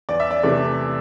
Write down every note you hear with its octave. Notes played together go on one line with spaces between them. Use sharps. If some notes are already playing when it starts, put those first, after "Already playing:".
E2 D5
E5
D5
C3 E3 A3 D5